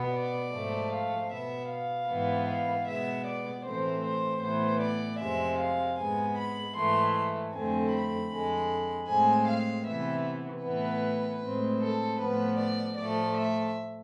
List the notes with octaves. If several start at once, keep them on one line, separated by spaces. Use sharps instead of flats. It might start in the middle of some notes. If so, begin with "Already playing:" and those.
Already playing: B2 B3
D5
G#2 F3 A3
F5
B2 B3 E5
F5
G#2 E3 B3
F5
B2 G#3 B3 E5
D5
A2 E3 A3 C4 C5
C5
A2 E3 B3 C5
D5
F2 C3 G#3 E5
F5
G#2 G#3 B3 G#5
B5
G#2 E3 A3 C6
F2 D3 A3 C4 G#5
B5
F2 D3 G#3
A2 G#3 C4 G#5
F5
C3 E3 B3 E5
A2 E3 B3 B4
A2 G#3 C4
A4
A2 F3 B3 B4
D5
A2 F3 A3 D5
E5